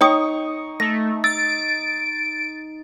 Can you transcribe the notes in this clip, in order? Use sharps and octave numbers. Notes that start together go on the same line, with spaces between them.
D#4 C#5 D#5 G5 C#6 D#6
A3 A#6
E6 A6 D7